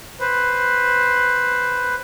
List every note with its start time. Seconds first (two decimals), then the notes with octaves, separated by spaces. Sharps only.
0.20 B4 C5